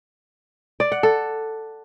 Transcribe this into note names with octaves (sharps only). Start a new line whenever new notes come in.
D5
F#5
A4